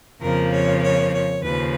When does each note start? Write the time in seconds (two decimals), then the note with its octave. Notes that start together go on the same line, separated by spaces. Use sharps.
0.21 F2 C#3 F3 A#3 A#4
0.52 C#5
0.83 C#5
1.12 C#5
1.42 D#2 C#3 F3 B4